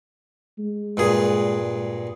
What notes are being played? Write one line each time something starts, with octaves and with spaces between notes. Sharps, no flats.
G#3
G2 A#2 G#4